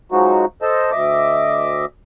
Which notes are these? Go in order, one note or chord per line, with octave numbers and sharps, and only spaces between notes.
F3 F#3 G#3 D#4 F#4
A4 C5 D#5 A5
D2 D#5 E5 D6